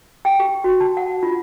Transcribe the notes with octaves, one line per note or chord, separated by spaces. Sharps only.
G5
G4
F#4
A5
F#5
F4